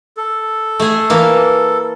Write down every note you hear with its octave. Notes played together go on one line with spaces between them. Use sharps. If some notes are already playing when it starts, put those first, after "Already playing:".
A4
A3 G#4
E3 A#3